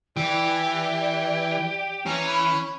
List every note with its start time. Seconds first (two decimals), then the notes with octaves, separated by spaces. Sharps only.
0.17 E3 G4 D5
2.06 E3 C#4 A#5
2.27 B5